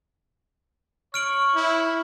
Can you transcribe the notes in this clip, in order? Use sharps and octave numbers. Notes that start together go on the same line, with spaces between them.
C#5 C#6 F6 D7 F#7
E4